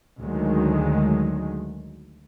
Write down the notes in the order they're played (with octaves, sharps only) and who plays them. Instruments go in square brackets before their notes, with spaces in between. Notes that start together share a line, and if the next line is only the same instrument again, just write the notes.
[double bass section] D2 D#3 F#3 G#3